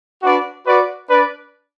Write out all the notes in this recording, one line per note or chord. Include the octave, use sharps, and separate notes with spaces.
D4 F#4 B4 D5
F#4 B4 D5
D4 B4 D5